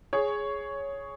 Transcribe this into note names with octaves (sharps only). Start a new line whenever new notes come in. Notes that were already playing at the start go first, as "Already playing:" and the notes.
G#4 C#5